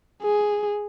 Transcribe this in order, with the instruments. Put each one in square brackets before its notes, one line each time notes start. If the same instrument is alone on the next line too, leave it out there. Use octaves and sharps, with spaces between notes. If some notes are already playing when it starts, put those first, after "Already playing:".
[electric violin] G#4